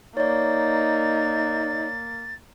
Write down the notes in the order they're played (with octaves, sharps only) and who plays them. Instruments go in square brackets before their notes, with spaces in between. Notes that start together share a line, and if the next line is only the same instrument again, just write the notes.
[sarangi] A#3 [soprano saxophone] D#4 [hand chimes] C#5 D5 [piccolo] A6